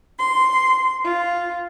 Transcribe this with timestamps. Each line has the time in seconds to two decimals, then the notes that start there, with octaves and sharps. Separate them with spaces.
0.18 C6
1.03 F4